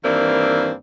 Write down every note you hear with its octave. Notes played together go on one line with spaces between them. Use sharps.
G2 D#3 E3 A#3 C4 D5